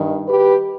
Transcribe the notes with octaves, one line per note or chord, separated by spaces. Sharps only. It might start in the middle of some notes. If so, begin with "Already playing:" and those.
Already playing: G2 D#3
G4 B4